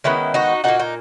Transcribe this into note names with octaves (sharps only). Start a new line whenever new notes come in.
D#3 G#3 B3 C#4 E4
D#4 F#4
A#2 A#3 D#4 F#4
D#4